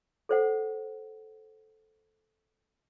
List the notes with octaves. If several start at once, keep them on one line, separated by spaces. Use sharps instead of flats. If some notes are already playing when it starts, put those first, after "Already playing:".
A4 C5 F#5